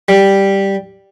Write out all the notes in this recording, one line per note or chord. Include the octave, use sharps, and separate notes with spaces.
G3